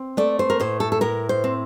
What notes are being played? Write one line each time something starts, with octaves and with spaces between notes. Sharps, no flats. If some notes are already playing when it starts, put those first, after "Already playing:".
Already playing: C4
A3 D5
C5
A#4
A2 C5
A4
A4
A2 A#4
C5
C4